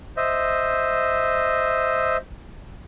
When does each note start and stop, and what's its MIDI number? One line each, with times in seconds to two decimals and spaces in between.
0.17 2.17 72
0.17 2.17 75
0.17 2.17 76